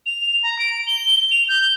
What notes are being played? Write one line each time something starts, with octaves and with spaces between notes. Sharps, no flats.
F7
A#5
D7
G7
F7
G6